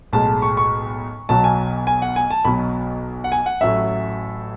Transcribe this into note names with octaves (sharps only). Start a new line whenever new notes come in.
B1 A2 G#3 A5
C#6
C#6
B1 B2 F#3 A5
G#5
G#5
F#5
G#5
A5
B1 B2 F#3 B5
F#5
G#5
F#5
A1 A2 F#3 E5